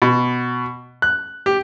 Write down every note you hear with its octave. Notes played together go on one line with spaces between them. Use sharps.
B2
F#6
G4